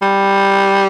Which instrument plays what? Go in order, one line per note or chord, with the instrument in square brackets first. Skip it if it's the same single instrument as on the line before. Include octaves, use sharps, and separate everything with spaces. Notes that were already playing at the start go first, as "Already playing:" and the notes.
[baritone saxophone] G3